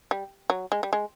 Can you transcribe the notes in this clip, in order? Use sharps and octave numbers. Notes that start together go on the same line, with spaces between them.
G3
F#3
G#3
G3
G#3